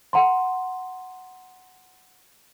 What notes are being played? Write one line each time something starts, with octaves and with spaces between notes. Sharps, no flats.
F#5 A#5 C6